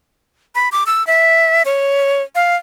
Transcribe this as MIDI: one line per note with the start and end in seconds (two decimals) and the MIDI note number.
0.55 0.69 83
0.72 0.84 86
0.87 1.05 88
1.07 1.63 76
1.65 2.22 73
2.35 2.56 77